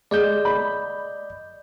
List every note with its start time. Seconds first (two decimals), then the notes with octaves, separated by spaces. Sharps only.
0.11 G#3 D5 D#5 G6
0.45 B5